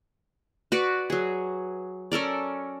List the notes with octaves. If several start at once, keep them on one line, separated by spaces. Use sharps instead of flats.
F#4 B4 D5
F#3 G#4
C#4 A4 A#4 D5